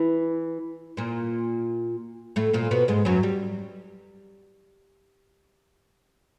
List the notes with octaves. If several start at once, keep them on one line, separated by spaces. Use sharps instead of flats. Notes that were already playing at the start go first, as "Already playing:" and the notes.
Already playing: E3 E4
A#2 A#3
A2 A3
A#2 A#3
B2 B3
G#2 G#3
F#2 F#3
G3